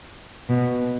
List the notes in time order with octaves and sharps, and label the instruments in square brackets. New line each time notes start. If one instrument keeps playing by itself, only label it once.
[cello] B2